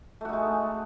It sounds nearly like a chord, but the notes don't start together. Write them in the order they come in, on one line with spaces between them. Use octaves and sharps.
A3 F#4 D#4 G#3